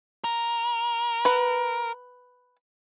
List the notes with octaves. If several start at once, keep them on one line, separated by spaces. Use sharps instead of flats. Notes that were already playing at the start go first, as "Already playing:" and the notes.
A#4
B4 F#5